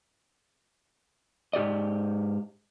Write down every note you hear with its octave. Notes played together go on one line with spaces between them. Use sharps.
G#2 G4 D5 D#5